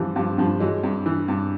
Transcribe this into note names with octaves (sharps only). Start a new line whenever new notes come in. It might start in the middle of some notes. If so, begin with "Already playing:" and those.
Already playing: G2 E3 F3 G3
G2 F3 G3
G2 F3 G3
E3 F#3 G#3
G2
E3
G2